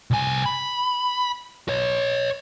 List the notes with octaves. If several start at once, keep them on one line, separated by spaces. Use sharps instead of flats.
C2 G#5
B5
B4 C#5